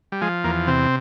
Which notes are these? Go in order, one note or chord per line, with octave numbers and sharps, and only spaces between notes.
G3
F3 G#3
E2 A#3
C3 C4